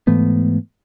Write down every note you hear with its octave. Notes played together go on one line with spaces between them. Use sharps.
G#2 E3 A3 B3